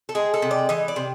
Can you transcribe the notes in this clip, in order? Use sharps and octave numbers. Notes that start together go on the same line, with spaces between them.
A4
G#3 G#4
A4
C3
D5
E3 D#5
D5
C3